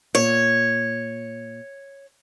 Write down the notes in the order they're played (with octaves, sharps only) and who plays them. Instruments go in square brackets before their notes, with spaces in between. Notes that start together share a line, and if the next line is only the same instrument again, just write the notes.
[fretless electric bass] A#2 [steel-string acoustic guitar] C#5